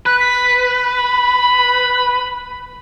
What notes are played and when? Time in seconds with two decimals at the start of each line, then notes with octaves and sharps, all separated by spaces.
0.06 B4 F#6
0.20 B6
0.94 B5